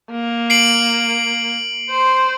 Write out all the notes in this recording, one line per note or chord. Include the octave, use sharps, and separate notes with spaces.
A#3
C7 D7 F#7
C5